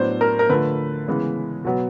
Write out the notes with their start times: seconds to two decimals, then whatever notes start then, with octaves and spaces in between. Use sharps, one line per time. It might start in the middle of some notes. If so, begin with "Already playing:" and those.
Already playing: A2 F#3 B3 D4 C5
0.21 A#4
0.39 A#4
0.49 D3 F3 A3 B4
1.08 C#3 E3 G#3 B3
1.65 B2 F#3 B3